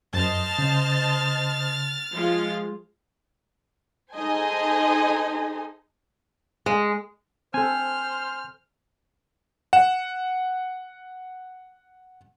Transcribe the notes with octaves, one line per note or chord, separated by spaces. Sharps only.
F#2 C5 D#5 A5 F6 A6
C#3
F3 G#3 F4
D#4 G#4 A4 C5 D#5 G#5
G#3
C4 A4 C5 G#5 F6
F#5 E7